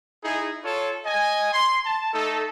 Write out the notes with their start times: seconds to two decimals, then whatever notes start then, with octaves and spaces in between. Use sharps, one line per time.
0.24 D#4 E4 G#4
0.63 F4 A4 C#5
1.04 D#5 G#5
1.52 C6
1.84 A5
2.13 A3 D#4 A4